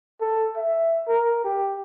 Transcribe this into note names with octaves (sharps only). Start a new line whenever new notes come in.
A4
E5
A#4
G4